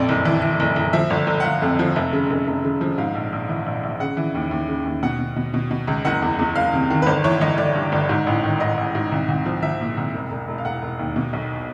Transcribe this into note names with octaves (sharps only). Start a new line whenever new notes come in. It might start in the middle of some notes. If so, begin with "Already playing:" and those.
Already playing: A#1 F2 D5
F#1
E3
E3
F#1
F#1
F3 E5
G1
G1
F#5
G1 F5
F2
F3
F1 E5
C#3
F1
F1
C#3
F3
G#2 F5
A#1
A#1
E3
A#1
A#1
C#3 F#5
E3
D#2
D#2
C#3
D#2
B2 F#5
B2
B2
B2
B2
C#2
F#1 F#5
E2
E2
F#1 F5
C3
D#3
B4
G1 C5
E3 C#5
G1 D#5
G1 D5
G2
G1
G#2
A1
D#3
A1 D#5
A1
G#2
C2
C2
F3
F3 E5
A#2
C2
E1
E1
E1
F5
E1 F#5
E1
D#2
B2
B1